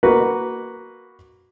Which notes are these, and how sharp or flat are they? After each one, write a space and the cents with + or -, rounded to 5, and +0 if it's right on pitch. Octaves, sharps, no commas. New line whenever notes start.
A#3 +0 F#4 +0 B4 +0